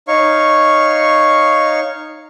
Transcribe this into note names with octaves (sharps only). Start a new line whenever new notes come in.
D#4 C#5 F5 C#6